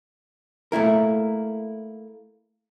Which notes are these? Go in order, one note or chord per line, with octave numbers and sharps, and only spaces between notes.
A3 A#3 E4 A#4